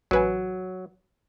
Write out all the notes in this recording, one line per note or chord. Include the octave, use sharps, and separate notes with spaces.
A1 F#3 B4 G#5